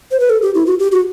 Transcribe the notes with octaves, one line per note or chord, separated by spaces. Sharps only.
C5
B4
A4
G4
E4
F#4
G4
F#4